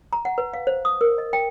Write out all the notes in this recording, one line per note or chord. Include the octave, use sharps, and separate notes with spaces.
A#5
F#5
B4
F5
C5
D#6
A#4
D#5
G5